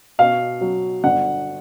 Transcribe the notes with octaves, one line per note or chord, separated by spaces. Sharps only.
B2 F5
F#3
G1 F#5